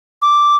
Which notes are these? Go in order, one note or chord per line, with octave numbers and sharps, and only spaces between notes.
D6